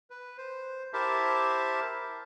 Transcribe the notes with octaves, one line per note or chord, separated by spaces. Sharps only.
B4
C5
E4 G4 A#4 C5 E5 A5